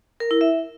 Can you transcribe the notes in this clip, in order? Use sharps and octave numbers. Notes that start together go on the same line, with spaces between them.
A#4
E4
E5